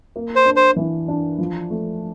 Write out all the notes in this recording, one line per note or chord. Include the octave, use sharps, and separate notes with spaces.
A#3
C5
D4
C5
E3
D4
F3
A3